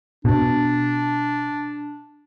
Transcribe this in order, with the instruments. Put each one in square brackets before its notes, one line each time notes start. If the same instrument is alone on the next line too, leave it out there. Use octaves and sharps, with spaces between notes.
[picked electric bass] B2 [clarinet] D4